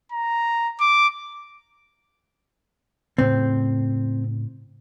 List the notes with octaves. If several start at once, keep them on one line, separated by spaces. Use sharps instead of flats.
A#5
D6
A2 C#3 C4